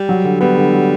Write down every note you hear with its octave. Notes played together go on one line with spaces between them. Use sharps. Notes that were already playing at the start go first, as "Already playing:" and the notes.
Already playing: G3
F#3
D3
G3 B3
D3
F#3